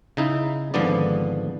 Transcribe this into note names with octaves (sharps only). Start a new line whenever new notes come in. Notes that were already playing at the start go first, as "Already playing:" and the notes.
C#3 D#4 E4
G#1 G#2 D3 F3 B3 D5